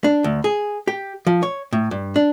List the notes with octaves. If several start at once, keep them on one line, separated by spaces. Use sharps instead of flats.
D4
D2
G#4
G4
F3
C#5
A2
G2
D4